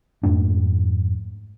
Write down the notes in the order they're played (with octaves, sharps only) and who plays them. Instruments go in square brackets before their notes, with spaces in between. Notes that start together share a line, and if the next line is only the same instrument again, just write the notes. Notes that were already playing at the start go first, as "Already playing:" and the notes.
[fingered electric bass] F2 G#2 A3 D4